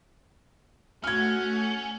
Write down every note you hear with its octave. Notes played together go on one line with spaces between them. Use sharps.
A3 C#4 F#4 F#5 F6 G#6